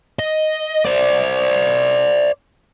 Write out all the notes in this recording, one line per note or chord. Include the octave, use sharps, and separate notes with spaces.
D#5
C5 D5